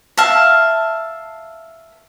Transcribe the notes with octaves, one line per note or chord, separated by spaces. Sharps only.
E5 F5 A5